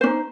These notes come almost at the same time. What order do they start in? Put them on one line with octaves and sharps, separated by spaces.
C5 C#4 D#4